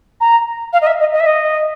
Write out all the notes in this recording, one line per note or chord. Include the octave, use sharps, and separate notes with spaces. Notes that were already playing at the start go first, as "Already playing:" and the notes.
A#5
F5
D#5
E5
D#5
D#5
E5
D#5